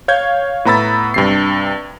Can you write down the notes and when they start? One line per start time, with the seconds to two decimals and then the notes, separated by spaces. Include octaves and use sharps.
0.08 C#5 F5 G6 G#6
0.65 A2 B3 A#5 B5 E6 A6
1.14 G2 C3 C7